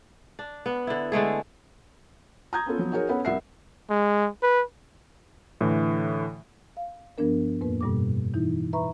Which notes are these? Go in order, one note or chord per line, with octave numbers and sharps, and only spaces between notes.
D4
B3
D3 E4
D3 G#3 A3 G#4
A#5 D#6 G6 G#6
B3 C#4 F4 A4
F3 F#3 B3
D#4 F#4 G#4 A#4 C#5
B3 C#4 A4 B4 C#5 F#5
C2 E4 A#4 E5 F#5 C7
G#3
B4
A2 D3 E3
F5
G2 F3 B3 D4 A#4
F2 A2 A#3 B4
G2 B2 G3 A4 D6
E3 D#4 E4
B4 E5 A#5 B5 C#6